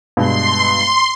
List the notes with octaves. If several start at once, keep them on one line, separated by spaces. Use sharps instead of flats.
G2 B2 G#3 C6